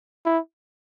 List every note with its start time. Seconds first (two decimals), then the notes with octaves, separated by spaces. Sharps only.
0.25 E4